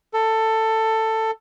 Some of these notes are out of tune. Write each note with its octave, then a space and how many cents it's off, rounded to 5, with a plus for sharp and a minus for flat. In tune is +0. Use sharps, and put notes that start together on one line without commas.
A4 +15